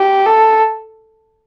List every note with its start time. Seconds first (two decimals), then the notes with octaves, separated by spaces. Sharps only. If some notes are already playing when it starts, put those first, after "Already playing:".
Already playing: G4
0.26 A4